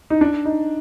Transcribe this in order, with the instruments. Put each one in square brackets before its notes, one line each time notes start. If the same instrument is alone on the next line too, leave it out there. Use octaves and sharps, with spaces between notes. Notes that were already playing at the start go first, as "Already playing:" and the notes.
[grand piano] D#4
D4
D#4